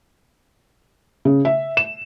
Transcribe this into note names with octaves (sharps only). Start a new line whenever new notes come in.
C#3
E5
E7